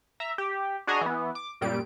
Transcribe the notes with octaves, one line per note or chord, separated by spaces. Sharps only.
E5 A#5
G4
D4 F#4 G#4 D#5 G#5 A#5
E3 B3
D6
F#2 A#2 G3 D7